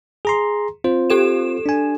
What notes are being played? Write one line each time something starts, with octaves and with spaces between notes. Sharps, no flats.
G#4 A#5 C6
C4 F4 C5
G4 A4 E7
D4 G#5